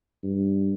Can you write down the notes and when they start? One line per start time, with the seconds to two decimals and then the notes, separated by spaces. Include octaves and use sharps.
0.23 G2